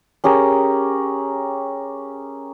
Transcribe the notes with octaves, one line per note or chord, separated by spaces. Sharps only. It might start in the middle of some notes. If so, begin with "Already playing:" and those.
C#4 G4 G#4 A#4